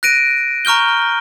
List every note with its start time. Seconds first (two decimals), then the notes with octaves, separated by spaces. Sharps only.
0.03 F#6 A#6 D7 D#7
0.65 A#5 C#6 F6 G6 G7